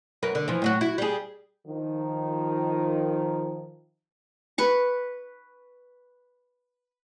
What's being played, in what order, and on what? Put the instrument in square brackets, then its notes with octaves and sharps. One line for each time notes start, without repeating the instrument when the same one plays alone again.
[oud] F#2 A#4 B4
D3
E3 F3
A2 F#3 F#4
E4 F#4
G3 G#4
[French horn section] D#3 F3
[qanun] B4 C#6